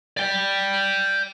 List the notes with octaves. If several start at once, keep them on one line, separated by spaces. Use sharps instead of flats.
D5 G5